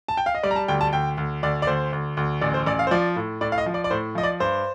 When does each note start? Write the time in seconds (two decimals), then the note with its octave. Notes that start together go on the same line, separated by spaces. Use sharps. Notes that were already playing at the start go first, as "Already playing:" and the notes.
0.08 A5
0.17 G5
0.26 F5
0.35 D#5
0.43 G3 D5
0.51 A#5
0.56 A5
0.68 D2 G5
0.81 A5
0.93 D2 G5
1.18 D2
1.43 D2 D5
1.62 D5
1.67 D2 C5
1.93 D2
2.17 D2
2.41 A1 D5
2.54 C5
2.66 A1 D5
2.79 F5
2.87 C5
2.91 F3 D5
3.16 A2
3.41 A2 D5
3.52 F5
3.58 D#5
3.66 F3
3.74 D5
3.84 D5
3.91 A2 C5
4.15 F3 D#5
4.23 D5
4.40 G2 C5